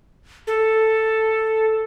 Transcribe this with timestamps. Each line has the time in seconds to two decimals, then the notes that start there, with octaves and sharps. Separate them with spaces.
0.47 A4